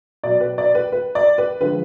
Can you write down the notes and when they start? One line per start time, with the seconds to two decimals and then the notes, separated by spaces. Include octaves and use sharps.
0.23 B2 F#3 D5
0.40 B4
0.58 D5
0.75 B4
0.92 B4
1.15 D5
1.38 B4
1.61 D3 F3 G#3 B4